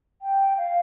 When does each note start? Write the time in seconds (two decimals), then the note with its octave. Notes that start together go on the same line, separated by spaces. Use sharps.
0.22 G5
0.58 F5